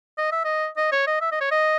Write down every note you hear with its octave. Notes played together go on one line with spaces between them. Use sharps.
D#5
E5
D#5
D#5
C#5
D#5
E5
D#5
C#5
D#5